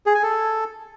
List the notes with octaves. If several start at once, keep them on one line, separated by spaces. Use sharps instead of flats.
G#4
G#5
A4